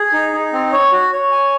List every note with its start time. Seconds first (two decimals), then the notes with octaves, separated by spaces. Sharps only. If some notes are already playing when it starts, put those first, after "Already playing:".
Already playing: G#4
0.13 D#4
0.33 D#4
0.53 C4
0.72 C#5
0.92 F#4
1.13 C#5
1.32 G#5